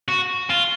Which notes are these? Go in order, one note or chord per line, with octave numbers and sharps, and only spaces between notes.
F#4
F4